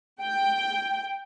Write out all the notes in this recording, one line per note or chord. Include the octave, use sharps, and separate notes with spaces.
G5